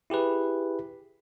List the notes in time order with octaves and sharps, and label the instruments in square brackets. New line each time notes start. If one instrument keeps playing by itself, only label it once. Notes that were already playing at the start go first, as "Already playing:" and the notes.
[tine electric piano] E4 G4 G#4 B4